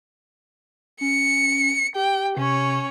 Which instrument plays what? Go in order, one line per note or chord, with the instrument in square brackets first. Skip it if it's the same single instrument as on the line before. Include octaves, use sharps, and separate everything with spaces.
[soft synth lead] C#4 [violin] C#7
[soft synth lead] G4 [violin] G5
[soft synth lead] C3 [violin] C#4 C#5